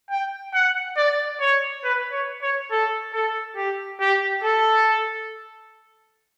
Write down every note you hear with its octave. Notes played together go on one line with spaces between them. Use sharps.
G5
F#5
D5
C#5
B4
C#5
C#5
A4
A4
G4
G4
A4